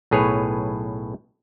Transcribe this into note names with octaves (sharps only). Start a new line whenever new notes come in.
B1 A2 G#4 B4 C#5